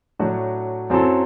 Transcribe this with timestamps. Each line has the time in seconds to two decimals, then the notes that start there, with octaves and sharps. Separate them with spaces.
0.19 A2 F#3 A3 D4 F#4
0.90 F#2 F#3 C4 E4 A4